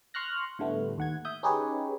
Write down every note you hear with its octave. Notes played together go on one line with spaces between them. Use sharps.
C6 C#6 F6 F#6 A#6
A2 D3 G3 A3 B3
D#2 F#5 G#6
E5 D#6 G6
C#4 D#4 G4 G#4 B4 C#5